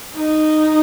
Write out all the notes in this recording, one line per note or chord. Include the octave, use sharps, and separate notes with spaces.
D#4